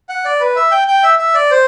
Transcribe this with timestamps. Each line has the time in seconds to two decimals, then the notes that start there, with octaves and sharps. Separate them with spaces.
0.09 F#5
0.25 D5
0.40 B4
0.56 E5
0.71 G5
0.88 G5
1.03 E5
1.19 E5
1.34 D5
1.51 C5